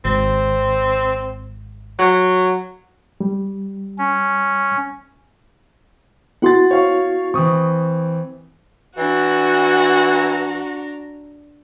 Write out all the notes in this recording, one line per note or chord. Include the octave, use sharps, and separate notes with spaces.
G#1 C4
F#3
G3
C#4
B3 E4 F#4 F#5 C6 A6
C#5 F5 C#6
E3 C4 C#6 D#6
E3 D4 F#4 A#5